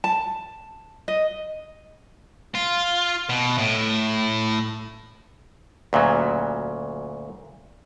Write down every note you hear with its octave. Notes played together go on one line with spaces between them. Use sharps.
A5
D#5
F4
B2
A2
D2 A#2 C#3 F#3